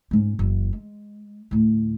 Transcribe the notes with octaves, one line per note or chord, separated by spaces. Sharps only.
G#2 C#4
F#1 E3
G#3
D2 A2